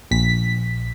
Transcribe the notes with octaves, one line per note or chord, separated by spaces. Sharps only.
A#1 B6